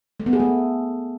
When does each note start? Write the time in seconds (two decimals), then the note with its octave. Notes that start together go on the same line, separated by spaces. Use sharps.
0.20 A3
0.26 B3
0.33 G#4
0.40 A3